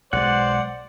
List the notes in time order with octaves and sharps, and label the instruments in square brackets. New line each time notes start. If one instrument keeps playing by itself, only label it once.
[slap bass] B1 G#3 [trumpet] C5 [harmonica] D5 [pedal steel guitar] F#5